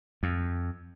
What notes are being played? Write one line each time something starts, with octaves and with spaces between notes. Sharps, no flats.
F2